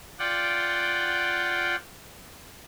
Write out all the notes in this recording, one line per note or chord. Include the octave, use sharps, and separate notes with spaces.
F4 D5 F#5 G5